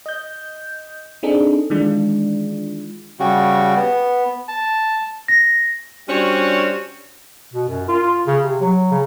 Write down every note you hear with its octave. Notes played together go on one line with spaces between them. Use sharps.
D#5 G6
C4 D4 D#4 G#4 A4
D#3 E3 G#3 D4 F4
C#3 G3 F#4
B3
A5
A#6
G3 C#4 D4 F#4 C5 C#5
B2
F#2
F4
C#3
C3
F#3
C#3